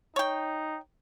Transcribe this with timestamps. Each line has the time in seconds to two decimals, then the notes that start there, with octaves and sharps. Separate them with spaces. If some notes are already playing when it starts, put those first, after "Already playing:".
0.16 D#4 C#5 G5